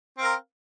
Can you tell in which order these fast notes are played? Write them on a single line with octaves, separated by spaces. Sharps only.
C4 F5 A#4